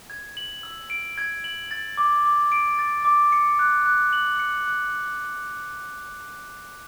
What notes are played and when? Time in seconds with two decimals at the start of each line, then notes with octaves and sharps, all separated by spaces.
0.10 G#6
0.37 F#7
0.63 E6
0.90 D7
1.18 G#6
1.44 F#7
1.71 A6
1.98 D6
2.25 D6
2.52 D7
2.79 A6
3.05 D6
3.32 C#7
3.59 F#6
3.86 F#6
4.13 F#7
4.39 C#7
4.66 F#6